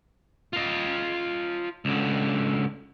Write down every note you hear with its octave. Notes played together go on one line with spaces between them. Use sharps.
F4 D#5
C#2 D3